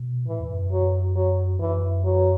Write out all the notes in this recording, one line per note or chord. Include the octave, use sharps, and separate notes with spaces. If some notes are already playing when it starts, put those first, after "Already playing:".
Already playing: B2
A2 E3
E2
F#2
F#3
F#3
F#2 E3
F#3